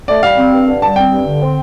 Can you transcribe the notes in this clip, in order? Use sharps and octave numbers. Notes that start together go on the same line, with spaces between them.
A3 D5
G3 F5
C4
G2
D3
G3 A5
C4 G5
G2
D3
C4